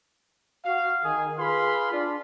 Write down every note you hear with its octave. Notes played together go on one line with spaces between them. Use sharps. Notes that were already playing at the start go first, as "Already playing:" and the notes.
F#4 F5
D#3 G#4
F4 G#4 B4 F5 B5 C6
D4 F4